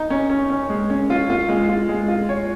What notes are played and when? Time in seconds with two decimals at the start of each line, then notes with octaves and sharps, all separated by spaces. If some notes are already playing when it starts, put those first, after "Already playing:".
Already playing: D#4
0.10 C#4
0.30 C#4
0.50 C#4
0.70 G#3
0.90 C#4
1.10 F4
1.30 F4
1.49 G#3
1.69 F4
1.89 G#3
2.08 F4
2.29 C#5